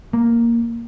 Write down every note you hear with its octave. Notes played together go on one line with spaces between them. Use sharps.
A#3